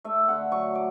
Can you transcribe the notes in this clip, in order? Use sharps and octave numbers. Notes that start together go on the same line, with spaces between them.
A3 E5
D3 F#5
F#3 C#6
D6